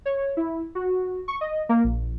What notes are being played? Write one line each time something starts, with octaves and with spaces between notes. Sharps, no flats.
C#5
E4
F#4
C#6
D#5
A#3
A#1